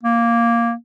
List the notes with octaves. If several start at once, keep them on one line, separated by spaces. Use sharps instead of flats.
A#3